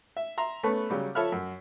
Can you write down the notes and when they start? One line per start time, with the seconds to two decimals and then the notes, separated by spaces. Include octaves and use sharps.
0.17 E5
0.38 E5 A#5 C6
0.63 A3 B3 C#4 A4 B4
0.90 C#3 F#3 G3
1.15 F3 A4 C#5 E5 B5 F6
1.32 F#2